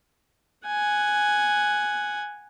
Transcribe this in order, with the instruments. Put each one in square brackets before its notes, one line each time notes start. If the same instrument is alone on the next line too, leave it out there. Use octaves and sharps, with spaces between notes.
[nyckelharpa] F#5 G#5